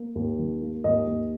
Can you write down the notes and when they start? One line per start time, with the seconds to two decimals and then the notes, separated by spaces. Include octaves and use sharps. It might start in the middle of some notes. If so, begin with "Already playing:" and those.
Already playing: A#3
0.15 D#2
0.39 D#3
0.61 A#3
0.84 D#2 D#5
1.07 D#2